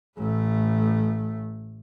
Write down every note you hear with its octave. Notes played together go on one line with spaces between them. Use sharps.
A1 A3